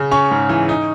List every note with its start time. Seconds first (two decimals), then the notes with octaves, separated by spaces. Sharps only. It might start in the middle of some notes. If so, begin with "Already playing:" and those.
Already playing: C#3
0.11 C#4 C#6
0.31 G#2
0.49 E3
0.69 D#4